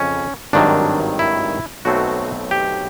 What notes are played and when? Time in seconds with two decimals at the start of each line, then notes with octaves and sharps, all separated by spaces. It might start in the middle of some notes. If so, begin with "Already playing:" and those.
Already playing: F2 C#3 C#4
0.53 G#1 G2 D#3 F#3 D4
1.19 E4
1.85 B1 B2 F#3 A3 C4 F#4
2.51 G4